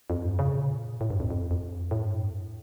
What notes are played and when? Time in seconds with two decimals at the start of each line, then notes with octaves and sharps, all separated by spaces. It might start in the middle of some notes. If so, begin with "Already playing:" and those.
0.10 F2
0.25 G2
0.39 C#3
0.55 A#2
1.01 A2
1.10 G2
1.20 F2
1.30 F2
1.51 F2
1.91 A2
2.07 G2
2.22 F2
2.31 G2